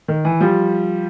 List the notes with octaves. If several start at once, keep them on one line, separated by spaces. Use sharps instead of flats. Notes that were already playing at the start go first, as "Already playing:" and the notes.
D#3
E3
F3 G3